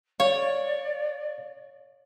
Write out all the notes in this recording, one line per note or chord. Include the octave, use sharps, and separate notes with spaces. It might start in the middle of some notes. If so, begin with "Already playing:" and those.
C#5 D5 F5